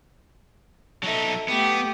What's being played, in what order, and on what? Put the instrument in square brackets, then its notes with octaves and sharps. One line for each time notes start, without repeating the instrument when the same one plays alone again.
[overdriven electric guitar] F#3 D#4 [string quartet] A4 E5
[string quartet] A3 G4 [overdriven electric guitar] B3